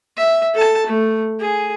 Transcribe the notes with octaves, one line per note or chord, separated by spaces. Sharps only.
E5
A4 A5
A3
G#4